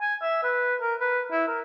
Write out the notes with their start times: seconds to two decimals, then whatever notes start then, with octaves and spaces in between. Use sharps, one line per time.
0.01 G#5
0.22 E5
0.43 B4
0.82 A#4
1.00 B4
1.32 E4
1.48 A#4